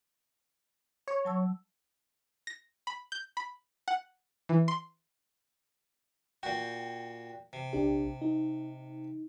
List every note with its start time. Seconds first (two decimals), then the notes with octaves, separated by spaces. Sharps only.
1.08 C#5
1.25 F#3 A5 E6
2.47 A#6
2.87 B5
3.12 G6
3.37 B5
3.88 F#5
4.49 E3
4.68 C6
6.43 A#2 F#4 G5
7.53 C3
7.73 A#1 D4 G4
8.22 D#4